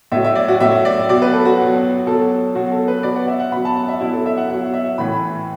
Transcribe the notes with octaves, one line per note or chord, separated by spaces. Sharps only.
A2 F#3 E5
E5
D5
F#4
A2 F#3 E5
D5
B2 F#3 D5
B4
A4
F#4
B2 F#3 F#4
B2 F#3 A4
B2 F#3 F#4
A4
B4
B2 F#3 D5
F#5
E5
F#5
B2 F#3 B5
A5
F#5
E5
B2 F#3 E4
A4
E5
F#5
B2 F#3 F#5
E5
A2 E3 B5